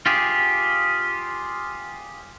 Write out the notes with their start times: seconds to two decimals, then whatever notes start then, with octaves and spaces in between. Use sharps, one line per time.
0.06 F4 G4 G#4